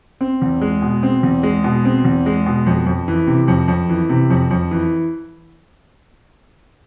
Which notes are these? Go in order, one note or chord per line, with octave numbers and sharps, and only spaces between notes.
C4
E2
G#3
B2
C4
E2
G#3
B2
C4
E2
G#3
B2
F2
F2
E3
C3
F2
F2
E3
C3
F2
F2
E3